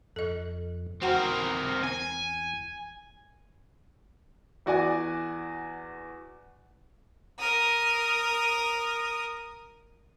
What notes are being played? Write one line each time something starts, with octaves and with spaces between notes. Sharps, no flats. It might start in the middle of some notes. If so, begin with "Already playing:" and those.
F2 A4 D#5
E2 C4 F#4 A#4 F#5
G#5
E2 F#4 D5 G#5
A#4 D#6